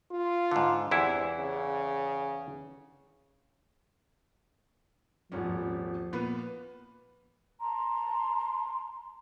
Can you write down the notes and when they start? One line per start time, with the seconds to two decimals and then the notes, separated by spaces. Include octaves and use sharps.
0.11 F4
0.51 G#2 D3
0.91 E2 C3 E3 E4
1.39 C#3
5.32 D#1 G#1 F3 C#4
6.13 A#2 B3 B4
7.59 A5 A#5 C6